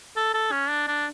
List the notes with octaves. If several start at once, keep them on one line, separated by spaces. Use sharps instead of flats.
A4
A4
C#4
D4
D4